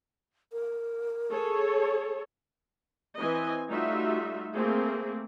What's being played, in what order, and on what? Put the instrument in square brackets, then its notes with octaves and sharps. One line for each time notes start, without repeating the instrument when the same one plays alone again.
[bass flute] A#4
[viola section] G#4 A4 C#5
E3 C4 D#5 G#5
G3 A3 D#4 F4 F#4 E5
A3 A#3 C4 G#4